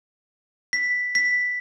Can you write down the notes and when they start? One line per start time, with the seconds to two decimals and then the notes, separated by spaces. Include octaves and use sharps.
0.73 B6
1.15 B6